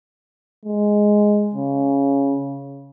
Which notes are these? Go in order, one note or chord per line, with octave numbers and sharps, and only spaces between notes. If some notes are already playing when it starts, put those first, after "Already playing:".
G#3
C#3